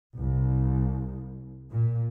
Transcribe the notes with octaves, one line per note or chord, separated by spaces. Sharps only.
C2
A#2